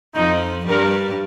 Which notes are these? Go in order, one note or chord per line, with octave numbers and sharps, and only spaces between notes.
F2 F3 D#4
G2 G3 A#4